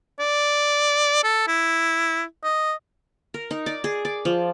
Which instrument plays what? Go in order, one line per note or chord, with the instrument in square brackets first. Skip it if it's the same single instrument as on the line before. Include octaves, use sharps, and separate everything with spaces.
[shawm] D5
A4
E4
D#5
[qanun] A#4
D#4
D5
G#4
D5
F3